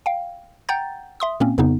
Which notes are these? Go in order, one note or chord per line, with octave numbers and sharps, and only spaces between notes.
F5 G5
F#5 G5 A#5 G6 A6
E5 C6 D#6
A#2 A#3 C4 C#4
F2 C#3 B3 D#4